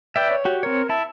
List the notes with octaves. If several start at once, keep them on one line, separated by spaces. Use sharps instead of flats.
B4 D5 E5 G5
C#5
F#4 G4
C4 A#4 C#5
E4 E5 A5